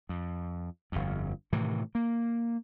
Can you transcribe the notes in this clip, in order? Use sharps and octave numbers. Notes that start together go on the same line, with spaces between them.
F2
G1 F2
A2 C3 D#3 E3
A#3